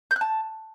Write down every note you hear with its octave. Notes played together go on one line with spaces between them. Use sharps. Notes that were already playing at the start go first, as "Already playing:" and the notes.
G6
F#6
A5